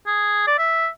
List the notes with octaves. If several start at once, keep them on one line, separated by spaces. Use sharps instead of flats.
G#4
D5
E5